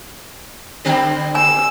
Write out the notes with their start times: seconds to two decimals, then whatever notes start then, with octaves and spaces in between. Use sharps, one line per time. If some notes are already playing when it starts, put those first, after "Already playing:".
0.85 D3 G3 C4
1.35 G#5 E6